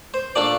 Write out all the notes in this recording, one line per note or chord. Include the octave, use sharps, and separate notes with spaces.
C5
A#2 A3 D4 D5